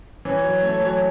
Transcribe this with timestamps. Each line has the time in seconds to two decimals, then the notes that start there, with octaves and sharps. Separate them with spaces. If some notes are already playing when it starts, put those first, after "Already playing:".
0.25 E3 C#5
0.44 F#3
0.63 A3
0.81 F#3